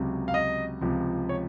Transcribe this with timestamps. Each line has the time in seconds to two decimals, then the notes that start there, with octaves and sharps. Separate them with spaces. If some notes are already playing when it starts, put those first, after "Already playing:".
Already playing: C#2 C3 F#3
0.28 F5
0.34 D#5
0.81 C#2 C3 F3
1.29 C#5